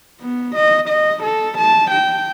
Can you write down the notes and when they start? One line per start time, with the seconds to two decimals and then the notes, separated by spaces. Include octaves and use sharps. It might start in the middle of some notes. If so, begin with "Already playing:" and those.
0.21 B3
0.55 D#5
0.89 D#5
1.23 A4
1.59 A5
1.91 G5